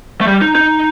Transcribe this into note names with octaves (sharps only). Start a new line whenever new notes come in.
A3
G3
D#4
D#4